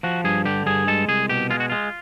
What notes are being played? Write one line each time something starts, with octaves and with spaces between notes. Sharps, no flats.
F3 F#4
G2 G#4
D3 G4
G2 G#4
G#3 A4
C2 G#4
B2 G4
G#3 F4
F#4
G#3 F4